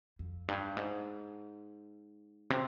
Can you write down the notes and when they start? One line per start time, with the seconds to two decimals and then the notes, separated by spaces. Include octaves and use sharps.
0.19 F2
0.48 G2
0.77 G#2
2.50 C3